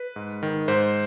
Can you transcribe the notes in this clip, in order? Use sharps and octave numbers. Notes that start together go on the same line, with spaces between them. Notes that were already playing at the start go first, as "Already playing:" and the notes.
Already playing: B4
G#2
D#3
G#2 C5